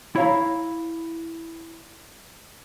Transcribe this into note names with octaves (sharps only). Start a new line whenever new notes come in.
E4 C#5 F5 A#5